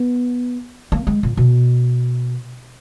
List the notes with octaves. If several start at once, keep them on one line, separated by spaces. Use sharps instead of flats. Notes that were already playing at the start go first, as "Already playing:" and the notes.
Already playing: B3
A#3
G#3
A#2
B2